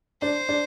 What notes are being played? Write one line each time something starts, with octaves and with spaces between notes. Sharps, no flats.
D4 C5
D4